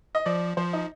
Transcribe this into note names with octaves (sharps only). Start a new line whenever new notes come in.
D#5
F3 D5
F3 C5
D#4